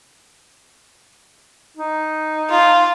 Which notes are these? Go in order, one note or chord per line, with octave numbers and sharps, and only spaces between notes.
D#4
F4